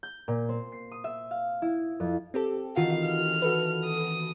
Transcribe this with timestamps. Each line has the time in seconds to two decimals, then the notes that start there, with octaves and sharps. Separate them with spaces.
0.03 G6
0.28 A#2
0.49 C4
0.72 C7
0.92 D#6
1.04 E5
1.31 F5
1.62 E4
2.00 F2
2.34 C4 G4 A4
2.76 D#3 E3 F4 F#4 F5
3.07 F6
3.42 F#4 A4 B4
3.85 D#6